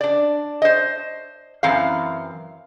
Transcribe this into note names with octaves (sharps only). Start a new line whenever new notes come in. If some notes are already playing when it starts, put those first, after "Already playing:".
D4 D5
C5 D#5
F#2 E3 C4 F5